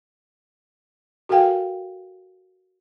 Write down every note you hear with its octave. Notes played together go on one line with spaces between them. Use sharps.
F#4 A4 A#4 F5 G5 G#5